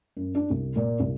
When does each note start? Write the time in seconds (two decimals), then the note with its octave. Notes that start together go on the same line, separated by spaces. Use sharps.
0.17 F#2
0.35 D4
0.50 C2
0.76 A#2
1.00 C2